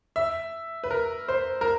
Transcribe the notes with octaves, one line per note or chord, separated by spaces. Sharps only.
E5
B4
A#4
C5
A#4